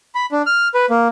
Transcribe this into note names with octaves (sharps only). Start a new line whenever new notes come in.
B5
D4
F6
B4
A#3